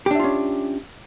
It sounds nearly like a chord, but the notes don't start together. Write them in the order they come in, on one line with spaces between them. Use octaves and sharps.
G4 D4 E5 F4 C#4